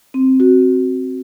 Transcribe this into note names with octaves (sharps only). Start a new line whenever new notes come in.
C4
F#4